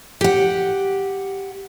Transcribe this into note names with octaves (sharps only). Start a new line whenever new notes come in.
G4 F#5